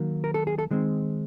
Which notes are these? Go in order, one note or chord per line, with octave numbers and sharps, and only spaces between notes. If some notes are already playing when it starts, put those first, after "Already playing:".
Already playing: D#3 F#3 A#3
A#4
A4
G#4
A4
D#3 G#3 C4